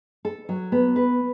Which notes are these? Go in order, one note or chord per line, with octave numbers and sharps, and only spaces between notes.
A4
F#3
B3
B4